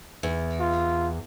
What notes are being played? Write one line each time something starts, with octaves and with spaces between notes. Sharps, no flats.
E2
F4